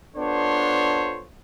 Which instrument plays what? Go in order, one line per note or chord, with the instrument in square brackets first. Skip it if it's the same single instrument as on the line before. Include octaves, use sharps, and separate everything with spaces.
[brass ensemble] B3 D4 F4 A4 C5 C#5